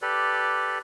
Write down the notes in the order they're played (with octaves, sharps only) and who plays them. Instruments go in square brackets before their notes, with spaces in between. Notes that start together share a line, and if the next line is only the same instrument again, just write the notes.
[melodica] G4 A4 B4 D5